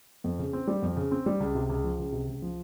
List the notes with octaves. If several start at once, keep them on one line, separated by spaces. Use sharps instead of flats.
F2
C#3
C4
G3
F2
C#3
C4
G3
C#2
C3
C#2
F3
C#2
C3
C#2
F3